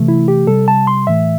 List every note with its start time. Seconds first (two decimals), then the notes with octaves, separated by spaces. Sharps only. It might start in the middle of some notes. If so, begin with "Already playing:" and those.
Already playing: C3 E3 A3
0.08 E4
0.28 G4
0.47 C3 G3 A4
0.68 A5
0.87 C6
1.07 A2 E3 A3 E5